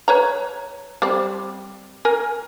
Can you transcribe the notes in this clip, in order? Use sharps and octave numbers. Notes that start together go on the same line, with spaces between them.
B4 C#5 A#5
G3 C4
A#4 G#5